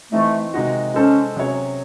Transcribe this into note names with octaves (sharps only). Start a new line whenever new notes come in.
E3 A3 C4 D#4
C3 D#3 G#3 D#4 F#4
G#3 C#4 D#4 A4 C5
C3 F#3 C#4 G#4 C#5